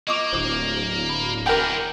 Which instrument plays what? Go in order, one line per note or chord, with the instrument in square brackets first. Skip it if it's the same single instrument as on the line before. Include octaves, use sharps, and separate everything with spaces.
[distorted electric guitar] A#3 [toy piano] D#5 C#6 D6
[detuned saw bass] D1 [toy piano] C5 D6
[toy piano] B5
[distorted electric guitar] E3 D4 [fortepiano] A#4 G5 [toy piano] G#5 B5 C6